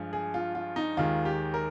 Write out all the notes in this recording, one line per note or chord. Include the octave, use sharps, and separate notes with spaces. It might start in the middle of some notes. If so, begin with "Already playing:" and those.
Already playing: G2 F3 G#3
G#4
F4
F4
D#4
D#2 D#3 G#3 F4
G4
A#4